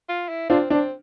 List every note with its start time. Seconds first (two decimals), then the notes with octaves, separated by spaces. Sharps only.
0.09 F4
0.29 E4
0.49 C4 D4 F4
0.70 C4 D4